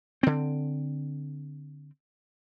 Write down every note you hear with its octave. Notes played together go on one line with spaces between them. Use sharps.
D3 C4